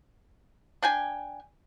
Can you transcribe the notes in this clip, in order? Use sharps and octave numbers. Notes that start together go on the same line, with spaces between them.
D4 G5 G#5